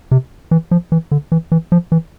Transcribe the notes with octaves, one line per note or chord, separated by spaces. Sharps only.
C3
E3
F3
E3
D3
E3
E3
F3
E3